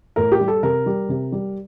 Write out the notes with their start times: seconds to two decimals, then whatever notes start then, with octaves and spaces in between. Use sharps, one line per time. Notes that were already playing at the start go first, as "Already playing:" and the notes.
0.16 A2 A#4
0.32 G4
0.40 G3
0.48 A4
0.63 C3 A#4
0.86 G3
1.09 C3
1.32 G3